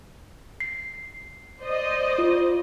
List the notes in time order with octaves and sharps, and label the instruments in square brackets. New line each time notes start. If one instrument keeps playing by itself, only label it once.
[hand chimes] C7
[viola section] C5 D5 D#5
[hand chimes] F4